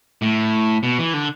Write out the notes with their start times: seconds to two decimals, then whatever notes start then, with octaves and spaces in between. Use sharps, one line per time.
0.22 A2
0.83 B2
0.99 E3
1.13 D3